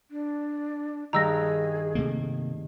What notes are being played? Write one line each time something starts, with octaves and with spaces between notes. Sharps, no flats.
D4
G2 D#3 G#4 A#5 E6 A#6
C3 A3 A#3